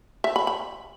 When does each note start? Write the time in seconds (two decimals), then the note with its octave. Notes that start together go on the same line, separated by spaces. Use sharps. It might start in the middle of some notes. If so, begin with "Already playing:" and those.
0.24 E5
0.36 B5
0.47 B5